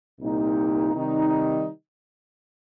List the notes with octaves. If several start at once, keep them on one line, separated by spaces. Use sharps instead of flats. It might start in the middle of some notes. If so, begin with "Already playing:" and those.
C2 A#2 A#3 D#4 G4
C3 D#3 G3 D#4